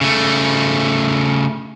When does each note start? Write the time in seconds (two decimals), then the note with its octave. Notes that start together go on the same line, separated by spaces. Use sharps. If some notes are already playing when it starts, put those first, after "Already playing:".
0.01 C#3 A3